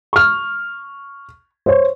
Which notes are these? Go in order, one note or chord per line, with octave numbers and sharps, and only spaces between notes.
C#6 F6
C5 C#5